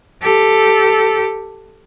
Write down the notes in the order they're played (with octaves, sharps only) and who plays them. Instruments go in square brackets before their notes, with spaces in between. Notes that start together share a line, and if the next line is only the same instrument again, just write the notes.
[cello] G4 A4